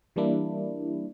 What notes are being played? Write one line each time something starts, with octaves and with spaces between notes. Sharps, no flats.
E3 G3 A#3 D4 E4